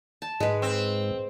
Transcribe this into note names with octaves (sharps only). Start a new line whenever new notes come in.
A5
G#2 G#3 B4
C4